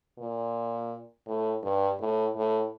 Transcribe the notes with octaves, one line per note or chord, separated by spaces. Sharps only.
A#2
A2
G2
A2
A2